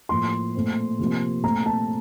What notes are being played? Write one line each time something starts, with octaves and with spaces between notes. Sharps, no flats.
A2 F3 A#3 C6
A#2 A3 C4
C3 F3 A#3
A#2 A3 C4 A#5
A5